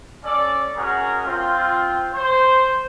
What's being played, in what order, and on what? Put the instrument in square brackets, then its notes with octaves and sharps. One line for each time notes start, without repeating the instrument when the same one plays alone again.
[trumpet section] C#4 A4 D5
G#3 C#4 F#4 G#4 A#4
C4 F4
C5